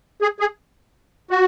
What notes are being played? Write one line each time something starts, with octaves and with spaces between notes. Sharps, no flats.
G#4
G#4
F#4